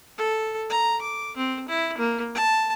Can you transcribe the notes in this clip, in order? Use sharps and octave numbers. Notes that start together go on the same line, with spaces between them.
A4
A#5
D6
C4
E4
A#3
A5